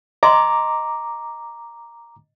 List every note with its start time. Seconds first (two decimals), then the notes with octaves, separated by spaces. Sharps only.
0.23 D#5 A#5 C6 D6